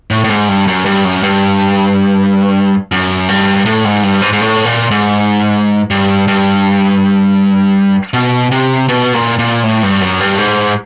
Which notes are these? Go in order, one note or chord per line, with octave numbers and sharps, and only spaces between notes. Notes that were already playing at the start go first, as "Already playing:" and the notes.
A2
A2
G#2
G2
F#2
G2
F#2
G2
F#2
G2
A2
G#2
G2
G#2
G#2
A2
A#2
G#2
G2
G2
B2
C3
B2
A#2
A#2
A2
G2
F#2
G2
G#2